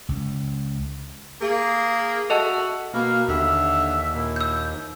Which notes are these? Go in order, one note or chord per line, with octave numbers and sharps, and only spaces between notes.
C#2
A#3 G#4
F#4 A4 D#5 E5 A5
B2 A#3 F5
D#2 D3 E5
A#2 E4
E6 G6